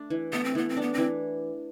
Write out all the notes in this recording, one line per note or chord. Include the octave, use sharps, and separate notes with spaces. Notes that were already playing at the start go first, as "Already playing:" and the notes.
Already playing: A3 D4
E3
A3 B3
C4
E3 B3
C4
B3 D4
E3 C4